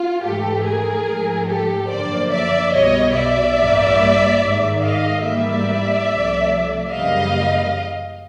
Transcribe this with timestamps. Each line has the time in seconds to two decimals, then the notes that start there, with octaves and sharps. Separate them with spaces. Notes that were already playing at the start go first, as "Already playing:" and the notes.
Already playing: F4
0.22 G#2 E3 A3 G4 A4
0.64 G#4 A#4
1.07 G#2 F3 A3
1.48 G4 A4
1.89 F#2 D3 F3 A#3 C5 D5
2.31 D5 E5
2.73 B1 B2 G3 C#5 D#5
3.15 D5 E5
3.57 A1 G2 E3 G3 A#3
4.40 G#2 D#3 G#3
4.82 D#5 F5
5.24 G#2 E3 G3 A#3 D5 E5
6.07 C2 C3 F3 A3
6.91 F#2 C#3 E3 G3 A#3 D#5 F5